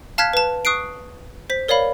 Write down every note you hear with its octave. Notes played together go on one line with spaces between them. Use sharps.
F5 A5 F6 F#6 G#6 B6
B4 A5
C#6 D#6 F#6 C7 D7
C5 B6
A#4 C#5 D5 F5 B5